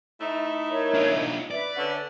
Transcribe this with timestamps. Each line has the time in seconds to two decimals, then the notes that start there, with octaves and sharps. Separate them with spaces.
0.21 A3 D#4 E4
0.69 A#4 C#5
0.94 D4 F4
1.51 B4 D5 E5
1.77 D3 C#4 F#5